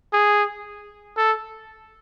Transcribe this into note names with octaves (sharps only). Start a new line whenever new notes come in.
G#4
A4